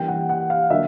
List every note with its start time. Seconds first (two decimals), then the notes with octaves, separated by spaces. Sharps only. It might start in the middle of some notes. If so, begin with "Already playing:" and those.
Already playing: E3 G3 A#3 D4 G5
0.08 F#5
0.29 F#5
0.50 F5
0.70 D3 F#3 A#3 E5